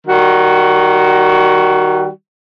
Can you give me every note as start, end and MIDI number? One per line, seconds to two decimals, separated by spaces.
0.07 2.09 51
0.07 2.09 55
0.07 2.09 66